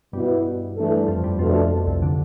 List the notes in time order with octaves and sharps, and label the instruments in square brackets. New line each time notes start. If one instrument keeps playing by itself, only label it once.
[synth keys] G2 G3 [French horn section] B2 B3 E4
[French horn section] E3 A3 D4 A4
[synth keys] G3
F2 F3
G2 G3
[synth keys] F2 F3 [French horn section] B2 A3 D4 A4
[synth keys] F2 F3
C2 C3
D3